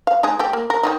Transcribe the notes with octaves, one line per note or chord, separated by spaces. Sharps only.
F5
G#3 D#4 G#4
A3 G4
A#3
A#4
D#3 E3 D#4